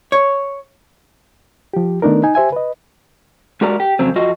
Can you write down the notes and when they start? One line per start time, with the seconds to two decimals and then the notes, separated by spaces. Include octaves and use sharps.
0.12 C#5
1.74 F3 G4
2.02 D#3 A3 B3 D4 D#4 A#4
2.24 D#4 G#5
2.35 G4 C5 E5 G#5
2.52 B4 D#5
3.61 G#3 F#4 G4 A#4 D5 A#5
3.80 G4
3.99 F2 C#3 F#3 C4
4.16 F2 F4 F#4 D#5